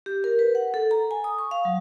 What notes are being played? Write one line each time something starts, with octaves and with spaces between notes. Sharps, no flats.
G4
A#4
B4
F#5
A4
A#5
G#5
D#6
C#6
F5
F#3